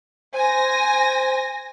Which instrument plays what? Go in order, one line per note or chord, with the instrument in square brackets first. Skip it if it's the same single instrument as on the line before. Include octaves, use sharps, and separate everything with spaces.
[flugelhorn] C5 [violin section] G#5 A#6